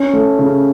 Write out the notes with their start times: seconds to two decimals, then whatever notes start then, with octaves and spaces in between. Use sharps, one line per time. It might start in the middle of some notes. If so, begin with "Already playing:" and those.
Already playing: C#4
0.13 A3
0.39 C#3